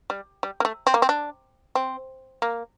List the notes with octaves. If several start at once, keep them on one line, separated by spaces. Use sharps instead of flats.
G3
G3
A#3
A3
C4
A#3
C4
D4
C4
A#3